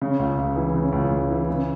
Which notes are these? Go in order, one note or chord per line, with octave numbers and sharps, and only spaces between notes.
C#3
C#2
C#2
E3
C#3
C#2
C#2
E3
C#3